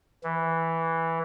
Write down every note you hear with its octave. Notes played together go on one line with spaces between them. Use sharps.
E3